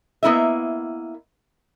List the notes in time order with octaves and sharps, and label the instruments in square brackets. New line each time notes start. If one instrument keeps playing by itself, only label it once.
[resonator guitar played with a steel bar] A#3 B3 E4 D#5 E5